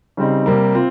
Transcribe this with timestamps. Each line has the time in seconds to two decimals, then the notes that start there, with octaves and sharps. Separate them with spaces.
0.17 C#3 G3 C4 D#4
0.46 C3 G3 A#3
0.75 C4 F4